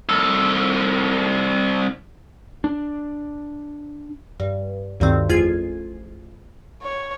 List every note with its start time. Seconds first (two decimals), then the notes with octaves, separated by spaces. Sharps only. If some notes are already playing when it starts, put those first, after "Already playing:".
0.09 C2 A4
2.64 D4
4.40 G2
5.00 D2 G2 D#3 C4
5.29 A1 F2 F4 G#4 G#6 C7
6.83 C#5